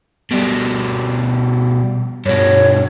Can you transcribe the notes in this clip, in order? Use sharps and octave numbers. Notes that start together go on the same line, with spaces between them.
B2 G3
G2 B2 C#5